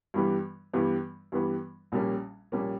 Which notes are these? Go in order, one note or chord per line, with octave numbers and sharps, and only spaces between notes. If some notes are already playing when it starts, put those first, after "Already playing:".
G2 E3 G3 B3
G2 E3 G3 B3
G2 E3 G3 B3
A#1 A#2 G3 A#3 C#4
A#1 A#2 G3 A#3 C#4